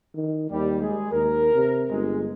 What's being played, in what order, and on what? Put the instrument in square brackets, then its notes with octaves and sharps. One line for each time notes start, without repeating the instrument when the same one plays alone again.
[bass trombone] D#3
[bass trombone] D#2 [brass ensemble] G3
[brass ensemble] G#3 G#4
[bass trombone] D#2 [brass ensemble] A#4
[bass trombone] C3
[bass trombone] G1 [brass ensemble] G#3